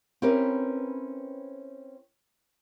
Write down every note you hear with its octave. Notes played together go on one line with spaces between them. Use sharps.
C4 C#4 E4 G4 A#4 B4